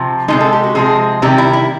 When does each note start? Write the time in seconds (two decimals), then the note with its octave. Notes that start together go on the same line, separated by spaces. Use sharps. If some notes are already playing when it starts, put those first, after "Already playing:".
Already playing: C3 F3
0.28 C3 F3 G#3 D#4
0.41 A4
0.53 G4
0.63 F#4
0.75 C3 F3 G#3 G#4
1.22 C3 D#3 G3 G4
1.38 E4
1.53 E4